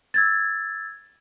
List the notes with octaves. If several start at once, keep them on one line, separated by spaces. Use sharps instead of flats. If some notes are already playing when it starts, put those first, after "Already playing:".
E6 G#6 A6